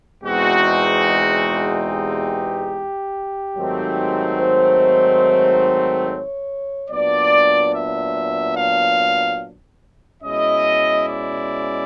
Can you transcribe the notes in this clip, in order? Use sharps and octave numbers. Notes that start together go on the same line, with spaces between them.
E2 B2 G#3 C4 D#4 F#4
G4
G#2 D#3 F#3 A3 C4
C5
C#5
A#2 F#3 B3 D4 D5
E5
F5
B2 G#3 C#4 E4 D#5
D5